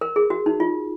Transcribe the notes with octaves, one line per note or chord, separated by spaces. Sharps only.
A#4
G#4
F#4
D#4
F4